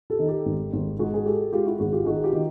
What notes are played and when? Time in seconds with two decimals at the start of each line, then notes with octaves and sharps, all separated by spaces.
0.10 G4 A4
0.19 D#3
0.28 G4 A4
0.45 G#1
0.73 G#1
0.99 G#2 F#4 G#4
1.14 G#4
1.25 G#3 G4 A4
1.53 G#3 F4 G4
1.66 E4 F#4
1.79 G#1 F#4 G#4
1.93 F4 G4
2.05 D#3 F#4 G#4
2.24 F4 G4
2.32 D#3